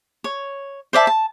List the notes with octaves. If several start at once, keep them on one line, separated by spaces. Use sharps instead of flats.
C#5
C5 D5 E5 A5
A5